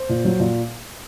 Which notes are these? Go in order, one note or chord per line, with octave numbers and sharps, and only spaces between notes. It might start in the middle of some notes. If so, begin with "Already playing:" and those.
Already playing: C5
A#2
F#3
A#2